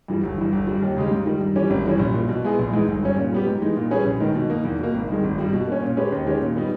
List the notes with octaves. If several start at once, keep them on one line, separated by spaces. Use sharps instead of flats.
G2 E3 G3
G1
G2 E3
G1
G2 G3
D#2
C#3 G#3 D#4 G4
G#2
D#3 G3
G2
E3 G3 C#4 G4
G#1
G2 E3 G3 C#4
A#1
A#2 G3
B2
G#3 B3 E4 G#4
A#1
G#2 E3 G#3 D#4
G1
G2 G3 C#4
A#2
G3 B3 G4
G#2
E3 G#3 D#4
A#2
G3 C#4 G#4 B4
A#1
G#2 D#3
B2
A#3 D#4
E2
B2 A#3
G#1
G2 D#3 G#3
G#1
G2 G3
B2
A#3 C#4
A#2
G#3 C#4 G4 B4
D#2
D#3 G#3 C#4 G4
A#2
G3 B3 D#4